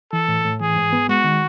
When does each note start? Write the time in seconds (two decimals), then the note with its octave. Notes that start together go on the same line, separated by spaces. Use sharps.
0.12 E3 A4
0.28 A2
0.45 A2
0.60 E3 G#4
0.76 G#2
0.93 B3
1.09 G#3 F#4
1.24 D#3